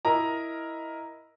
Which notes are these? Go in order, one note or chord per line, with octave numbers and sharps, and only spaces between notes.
E4 A#4 D#5 A#5